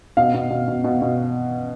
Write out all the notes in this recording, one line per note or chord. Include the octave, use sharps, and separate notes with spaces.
B2 F5
B2
B2
B2
B2
B2